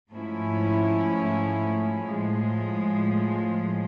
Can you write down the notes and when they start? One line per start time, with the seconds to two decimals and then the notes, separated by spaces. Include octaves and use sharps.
0.11 G#2 F3 A3 C#4 E4
2.05 A2 F3 G#3